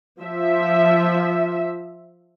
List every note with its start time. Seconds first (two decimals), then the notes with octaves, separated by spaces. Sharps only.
0.21 F3 E5